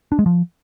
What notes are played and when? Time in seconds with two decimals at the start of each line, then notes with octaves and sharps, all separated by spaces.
0.12 D4
0.19 G#3
0.26 F3